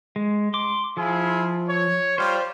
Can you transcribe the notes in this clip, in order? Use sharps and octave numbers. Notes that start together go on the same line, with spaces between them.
G#3
C6 D6
F3 E4 F4 G#4
C#5
G3 F4 C5